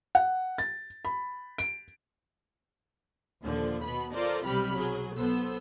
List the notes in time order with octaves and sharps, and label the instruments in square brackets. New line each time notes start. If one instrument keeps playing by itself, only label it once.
[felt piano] F#5
A6
B5
D7
[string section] D#2 A#2 D3 F3
B2 B3 B5
F4 A4 A#4 C5 D5
B1 C3 G3 G4 B5 F6
F#3 G#4
B1 B3 A4 C5 E6